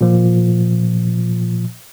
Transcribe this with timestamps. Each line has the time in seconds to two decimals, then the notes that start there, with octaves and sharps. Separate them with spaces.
0.01 A#2 F3